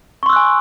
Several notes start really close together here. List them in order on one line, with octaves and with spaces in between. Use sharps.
C#6 C6 E6 F#6 G#5